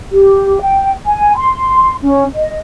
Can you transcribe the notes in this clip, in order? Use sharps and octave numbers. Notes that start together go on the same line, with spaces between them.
G4
G5
G#5
C6
C#4
D#5